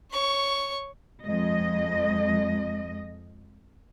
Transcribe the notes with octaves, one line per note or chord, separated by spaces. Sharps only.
C#5 C#6
F2 G#3 D#5